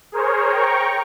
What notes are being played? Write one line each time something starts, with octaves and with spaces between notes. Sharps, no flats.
G#4 A#4 C5 C#5
G5 A#5 C#6